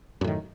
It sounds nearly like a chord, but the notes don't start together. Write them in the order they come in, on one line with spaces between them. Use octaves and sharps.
F#2 A2 D#3